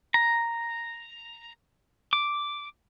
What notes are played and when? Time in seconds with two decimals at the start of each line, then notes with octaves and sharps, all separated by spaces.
0.14 A#5
2.13 D6